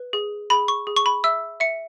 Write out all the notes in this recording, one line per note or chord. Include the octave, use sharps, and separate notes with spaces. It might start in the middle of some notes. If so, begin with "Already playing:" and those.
Already playing: B4
G#4
G#4 B5
C#6
G#4
C#6
B5
E5 E6
E5 C#7